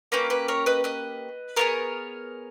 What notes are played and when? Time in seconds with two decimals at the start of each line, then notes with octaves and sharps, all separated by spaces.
0.12 A#3 C#4 G4 B4
0.30 B4
0.48 A#4 C#5
0.66 B4 D#5
0.84 B4 D#5
1.56 B3 E4 G#4 A#4 C#5